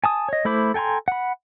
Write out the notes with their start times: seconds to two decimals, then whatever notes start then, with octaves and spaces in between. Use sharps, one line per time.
0.04 G#5 A5 D#6
0.29 C#5 D#5
0.45 A3 E4 C5 B5 D6
0.74 A4 G5 G#5 A#5 C6
1.08 F#5 B5